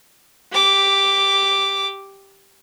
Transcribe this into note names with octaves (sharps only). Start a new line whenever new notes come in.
G4 D6